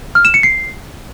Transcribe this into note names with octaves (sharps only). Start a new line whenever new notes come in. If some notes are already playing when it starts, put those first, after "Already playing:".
F6
E7
C#7
C7